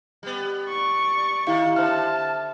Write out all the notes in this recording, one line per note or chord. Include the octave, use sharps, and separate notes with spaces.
G3 B3
D5 C#6
D#3 E4 G4 F5 C#7
D3 C5 E5 A5 F6